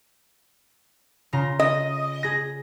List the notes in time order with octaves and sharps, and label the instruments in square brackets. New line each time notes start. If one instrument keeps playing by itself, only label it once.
[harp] C#3 F4 A#5
[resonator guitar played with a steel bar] D#5
[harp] G#4 A#6